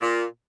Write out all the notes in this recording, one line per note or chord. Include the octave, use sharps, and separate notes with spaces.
A#2